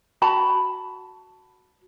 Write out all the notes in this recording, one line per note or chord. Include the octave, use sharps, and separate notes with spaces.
F#4 A5 B5